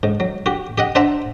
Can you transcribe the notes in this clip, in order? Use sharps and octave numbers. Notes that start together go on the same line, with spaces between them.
G#2
F#3
F#4 G4
G4 D#5 F#5
D4 C5 E5 F#5 A5 A#5